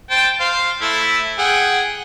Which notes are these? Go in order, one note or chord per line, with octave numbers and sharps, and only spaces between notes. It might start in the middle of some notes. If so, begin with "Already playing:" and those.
C5 G5 A5
C5 F5
A3 E4 E5
G#4 F#5 G5